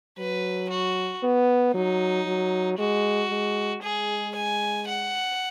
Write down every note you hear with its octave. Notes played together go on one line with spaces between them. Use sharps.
F#3 B4
F#4
B3
F#3 D#4
F#3
G#3 F#4
G#3
G#3 G#4
G#5
F#5